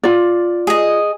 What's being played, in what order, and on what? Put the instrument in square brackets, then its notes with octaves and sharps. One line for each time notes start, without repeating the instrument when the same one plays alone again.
[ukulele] F4 D5
[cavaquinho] G#4 D#5